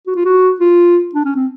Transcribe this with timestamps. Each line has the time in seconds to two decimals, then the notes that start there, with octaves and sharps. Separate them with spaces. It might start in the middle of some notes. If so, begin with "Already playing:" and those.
0.07 F#4
0.16 F4
0.25 F#4
0.60 F4
1.15 D4
1.25 C#4
1.36 C4